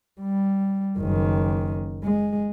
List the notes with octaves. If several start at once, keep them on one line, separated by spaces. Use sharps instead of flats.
G3
F#1 D#3
G#3